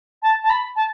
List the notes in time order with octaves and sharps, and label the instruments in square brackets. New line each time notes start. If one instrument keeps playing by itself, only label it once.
[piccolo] A5
A5
B5
A5